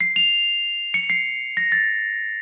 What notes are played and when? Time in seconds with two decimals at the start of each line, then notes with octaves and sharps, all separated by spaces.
0.01 C7
0.16 F7
0.94 C#7
1.10 C7
1.57 A#6
1.72 A6